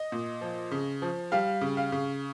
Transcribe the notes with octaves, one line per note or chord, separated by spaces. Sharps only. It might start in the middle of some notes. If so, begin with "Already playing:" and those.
Already playing: D#5
A#2
F3
C#3
F3
G3 F5
C#3
F5
C#3